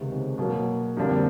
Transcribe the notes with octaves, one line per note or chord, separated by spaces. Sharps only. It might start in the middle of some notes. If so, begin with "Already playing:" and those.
Already playing: C#2 C3 D#3 G#3 B3
B2 F#3 A#3
F2 D3 G3 A#3 D4